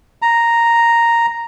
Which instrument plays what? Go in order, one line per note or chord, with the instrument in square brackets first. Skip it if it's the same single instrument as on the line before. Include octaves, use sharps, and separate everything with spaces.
[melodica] A#5